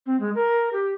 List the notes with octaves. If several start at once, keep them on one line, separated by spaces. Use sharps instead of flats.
C4
G#3
A#4
G4